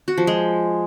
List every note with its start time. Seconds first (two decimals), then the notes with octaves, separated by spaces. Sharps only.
0.08 F#4
0.18 F3
0.27 G#3